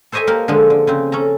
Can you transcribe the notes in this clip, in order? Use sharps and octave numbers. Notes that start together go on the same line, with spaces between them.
A4 C5 C#5 D#5 E5 G#5
A#3 G4 A#4
D3 F3 G#3
D3
C#3 C4
C#4 A4 A#5